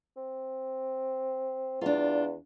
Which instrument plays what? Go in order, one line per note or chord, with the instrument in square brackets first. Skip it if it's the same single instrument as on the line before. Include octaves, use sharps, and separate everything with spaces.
[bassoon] C4
[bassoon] E2 [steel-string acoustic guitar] D4 F4